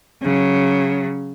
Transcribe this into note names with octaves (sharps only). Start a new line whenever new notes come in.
C#3 F#3